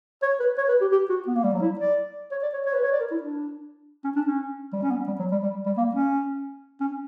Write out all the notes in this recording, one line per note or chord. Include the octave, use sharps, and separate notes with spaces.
C#5
B4
C#5
B4
G4
G4
F#4
B3
A#3
G3
F#3
E4
D5
C#5
D5
C#5
C#5
B4
C#5
D5
A#4
E4
D4
C#4
D4
C#4
G3
C#4
B3
G3
F#3
G3
G3
G3
A#3
C#4
C#4